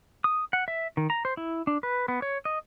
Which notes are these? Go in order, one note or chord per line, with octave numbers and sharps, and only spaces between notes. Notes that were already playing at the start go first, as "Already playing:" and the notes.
D#6
F#5
E5
D#3
A#5
C5
E4
D4
B4
B3
C#5
D#5